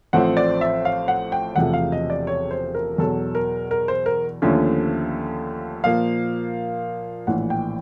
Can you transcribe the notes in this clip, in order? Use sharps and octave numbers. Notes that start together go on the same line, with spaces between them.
A1 A2 F3 A3 C4 F#5
D5
E5
F5
F#5
G5
E1 E2 C3 F3 A3 F#5
F5
D#5
D5
C#5
C5
A#4
E2 B2 F#3 A4
A#4
A#4
C5
A#4
D#2 D3 F3 A3 C#4
A#2 F3 A#3 F5
A#1 A2 E3 F#5
G5